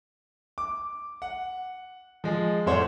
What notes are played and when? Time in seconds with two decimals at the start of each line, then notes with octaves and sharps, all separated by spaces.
0.58 D6
1.22 F#5
2.24 F3 G#3 G#4
2.66 F2 A2 C5 C#5 F#5